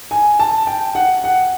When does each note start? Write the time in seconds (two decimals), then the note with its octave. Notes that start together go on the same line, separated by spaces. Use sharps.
0.11 G#5
0.39 A5
0.67 G5
0.95 F#5
1.24 F#5